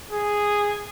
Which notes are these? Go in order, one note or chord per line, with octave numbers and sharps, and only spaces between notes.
G#4